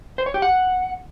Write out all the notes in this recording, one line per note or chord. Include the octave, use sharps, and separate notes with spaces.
C5
C#5
G4
F#5